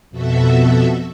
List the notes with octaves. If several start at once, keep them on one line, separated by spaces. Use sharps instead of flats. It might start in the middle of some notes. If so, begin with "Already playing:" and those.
F2 B2 F#4 A4 E5